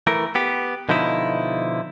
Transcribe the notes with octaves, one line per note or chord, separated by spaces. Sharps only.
E3 A3 A#4
B3 G4
B2 D3 F3 D#4 E4